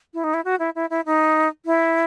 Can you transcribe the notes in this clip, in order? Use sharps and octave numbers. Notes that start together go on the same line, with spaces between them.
E4
D#4
E4
F#4
E4
E4
E4
D#4
E4